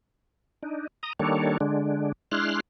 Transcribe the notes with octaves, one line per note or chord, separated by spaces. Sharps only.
D4 D#4
A#5 D#6
D#3 G3 A#3 D4 A4 C#5
D3 G#3 D4
G#3 D4 E4 C6 F6 F#6